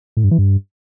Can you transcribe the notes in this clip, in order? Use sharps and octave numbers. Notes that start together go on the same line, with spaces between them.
A2
G2
E3
G2